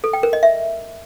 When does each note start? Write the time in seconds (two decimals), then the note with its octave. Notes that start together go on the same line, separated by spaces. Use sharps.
0.04 A4
0.13 G5
0.23 A#4
0.33 D#5
0.43 E5